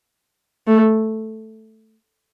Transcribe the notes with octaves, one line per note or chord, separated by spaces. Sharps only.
A3